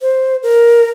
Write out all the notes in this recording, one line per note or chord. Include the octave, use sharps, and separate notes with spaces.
C5
A#4